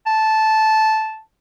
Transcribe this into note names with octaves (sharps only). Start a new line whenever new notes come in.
A5